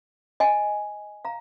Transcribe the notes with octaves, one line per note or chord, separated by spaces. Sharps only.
D#5 G#5
F5 A#5